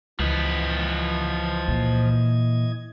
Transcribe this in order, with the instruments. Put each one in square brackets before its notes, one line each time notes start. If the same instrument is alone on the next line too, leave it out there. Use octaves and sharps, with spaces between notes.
[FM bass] C#2 [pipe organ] E3 D#5 G#6 [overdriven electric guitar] F3 B4
[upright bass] A#2